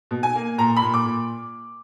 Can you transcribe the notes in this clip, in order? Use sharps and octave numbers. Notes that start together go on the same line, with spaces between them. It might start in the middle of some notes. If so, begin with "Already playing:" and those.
B2
G#5
A#3
A#2 A#5
B5
A#2
D6
A#2